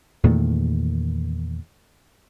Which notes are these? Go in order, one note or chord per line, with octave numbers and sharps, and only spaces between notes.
E2 A#2 D#3 A3